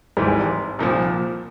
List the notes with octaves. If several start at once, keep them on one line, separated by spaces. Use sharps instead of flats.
G#1 G#2 E3 G3
C2 A#2 F3